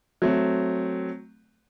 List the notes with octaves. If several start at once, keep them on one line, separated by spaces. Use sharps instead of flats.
F#3 A3 C4